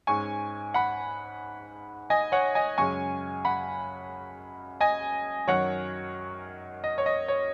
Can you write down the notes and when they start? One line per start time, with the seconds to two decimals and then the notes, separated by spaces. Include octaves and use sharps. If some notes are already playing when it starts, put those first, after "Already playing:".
0.07 G#2 G#3 C#4 G#5 C#6
0.74 F#5 B5
2.10 D#5 G#5
2.32 C#5 F#5
2.55 D#5 G#5
2.78 F#2 C#3 G#3 C#4 G#5 C#6
3.45 F#5 B5
4.81 D#5 G#5
5.48 F#2 D#3 F#3 C#5 F#5
6.84 D#5
6.98 C#5
7.06 D#5
7.28 C#5